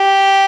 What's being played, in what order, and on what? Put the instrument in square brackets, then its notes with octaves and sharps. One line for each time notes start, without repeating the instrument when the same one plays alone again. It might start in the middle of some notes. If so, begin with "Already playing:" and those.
Already playing: [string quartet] G4